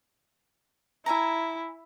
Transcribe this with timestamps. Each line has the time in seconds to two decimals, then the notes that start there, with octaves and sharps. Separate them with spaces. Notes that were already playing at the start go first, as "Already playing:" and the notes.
1.06 E4 E5 G#5 A#5